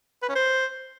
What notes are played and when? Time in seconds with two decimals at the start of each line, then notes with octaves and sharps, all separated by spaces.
0.23 B4
0.29 C#4
0.36 C5